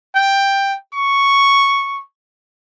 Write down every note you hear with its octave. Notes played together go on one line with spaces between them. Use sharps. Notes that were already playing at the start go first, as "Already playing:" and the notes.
G5
C#6